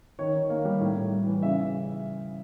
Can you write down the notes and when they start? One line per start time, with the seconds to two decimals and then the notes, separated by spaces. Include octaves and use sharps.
0.19 D#3 C#5
0.35 D#3
0.50 A#3
0.65 G3
0.80 A2
0.97 A2
1.12 G3
1.27 E3
1.43 C#3 E5